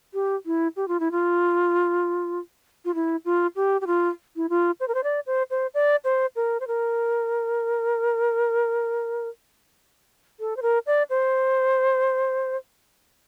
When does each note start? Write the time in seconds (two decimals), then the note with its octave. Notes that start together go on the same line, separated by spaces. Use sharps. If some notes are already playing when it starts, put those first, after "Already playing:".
0.14 G4
0.46 E4
0.76 G4
0.88 F4
1.00 E4
1.11 F4
2.85 F4
2.95 E4
3.25 F4
3.56 G4
3.81 G4
3.87 F4
4.36 E4
4.49 F4
4.80 C5
4.88 A#4
4.94 C5
5.04 D5
5.26 C5
5.51 C5
5.74 D5
6.05 C5
6.36 A#4
6.60 C5
6.67 A#4
10.40 A4
10.57 C5
10.62 A#4
10.87 D5
11.10 C5